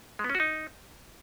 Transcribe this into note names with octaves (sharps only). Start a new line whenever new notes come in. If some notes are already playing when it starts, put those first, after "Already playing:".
G#3
B3
C#4
F#4
D#4